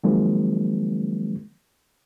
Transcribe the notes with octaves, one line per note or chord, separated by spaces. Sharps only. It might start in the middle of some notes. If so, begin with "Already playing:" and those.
D#3 F3 F#3 G#3 A#3 C4